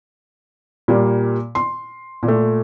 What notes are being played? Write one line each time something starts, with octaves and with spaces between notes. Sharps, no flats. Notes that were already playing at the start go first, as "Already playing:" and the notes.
A#2 G3 A#3
C6
A#2
A3